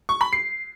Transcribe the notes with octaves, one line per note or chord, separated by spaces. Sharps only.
C#6
B5
C7